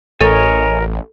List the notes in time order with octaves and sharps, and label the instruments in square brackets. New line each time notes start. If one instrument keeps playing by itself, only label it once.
[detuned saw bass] A1 [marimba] A4 [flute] A#4 [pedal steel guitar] C#5 D#5 G#5